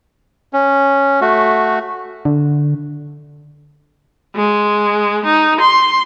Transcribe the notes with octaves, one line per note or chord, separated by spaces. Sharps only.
C#4
A3 F#4
D3
G#3
D#4
C6